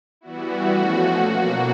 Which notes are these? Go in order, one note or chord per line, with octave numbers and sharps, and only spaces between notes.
E3 G3 B3 E4 F#4
F3 A3 C#4
B2 F#3 A#3 F#4